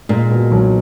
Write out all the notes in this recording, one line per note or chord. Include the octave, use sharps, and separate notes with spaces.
A#2 G#3
B2
B1